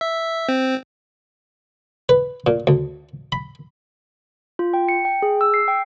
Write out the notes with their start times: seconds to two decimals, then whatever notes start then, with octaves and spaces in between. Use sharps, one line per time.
0.01 E5
0.49 C4
2.09 B4
2.47 A#2
2.67 D2
3.32 B5
4.59 F4
4.74 G5
4.89 C#7
5.05 G5
5.22 G#4
5.41 E6
5.54 C7
5.68 G5